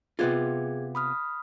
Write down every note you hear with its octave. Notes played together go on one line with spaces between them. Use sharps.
C3 B3 F4 G#4 G#6
B5 D#6 F6